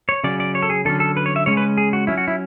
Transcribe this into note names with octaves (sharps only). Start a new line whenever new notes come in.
C#5
C#3 F#3 C#4 D5
D5
C#5
A4
G#4
D3 F#3 C#4 A4
A4
B4
C#5
E5
C#3 G#3 C#4 C#5
B4
G#4
F#4
F#3 C#4 E4
F#4
E4